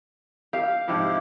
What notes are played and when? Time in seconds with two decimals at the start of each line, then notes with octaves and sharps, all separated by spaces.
0.53 G4 F5
0.88 G#2 C3 F3 E4 G4